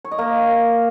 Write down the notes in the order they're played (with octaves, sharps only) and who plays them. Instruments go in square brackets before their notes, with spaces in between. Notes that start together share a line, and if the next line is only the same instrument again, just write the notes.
[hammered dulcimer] C#5
D#5
A#3